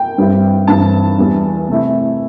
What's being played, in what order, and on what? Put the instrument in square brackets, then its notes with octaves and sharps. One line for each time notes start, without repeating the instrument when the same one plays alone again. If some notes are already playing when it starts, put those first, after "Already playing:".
Already playing: [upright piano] G5
G2 G3 C4 E4
G2 E3 C4 A5
E2 E3 G3 D4
C3 A3 E4